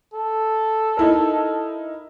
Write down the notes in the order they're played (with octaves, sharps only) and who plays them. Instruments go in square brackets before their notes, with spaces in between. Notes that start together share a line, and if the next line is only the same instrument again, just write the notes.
[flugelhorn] A4
[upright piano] D#4 E4 A#4